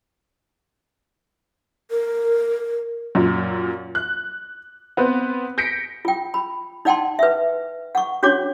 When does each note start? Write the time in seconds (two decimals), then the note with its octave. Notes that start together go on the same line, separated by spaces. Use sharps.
1.91 A#4
3.15 F#2 A#2
3.95 F#6
4.97 B3 C4 B4
5.58 G6 A#6 B6 C#7 D7
6.05 F4 G5
6.34 B5
6.85 D#4 D5 F#5 G5 A5 C6
7.19 B4 E5
7.95 F#5 C#6
8.23 C#4 D4 F#4 C#5 D6